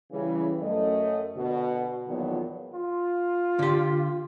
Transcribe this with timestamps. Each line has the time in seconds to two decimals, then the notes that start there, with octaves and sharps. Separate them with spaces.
0.12 C#3 E3 G3
0.62 F#2 A3 D#5
1.36 B2 D3 F#4
2.07 E2 A#2 D#3 F3 F#3 B3
2.74 F4
3.59 D3 G4